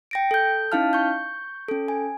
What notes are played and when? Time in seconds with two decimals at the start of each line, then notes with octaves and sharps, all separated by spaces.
0.11 G5 A#6 D7
0.31 A4 G6
0.72 C#4 D#4 E4 F5 A5 F6
0.93 C#6 G6
1.69 C#4 A4
1.88 G#5